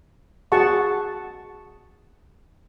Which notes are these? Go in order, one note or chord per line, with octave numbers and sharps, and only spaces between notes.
F#4 G#4 F#5 A5 C#6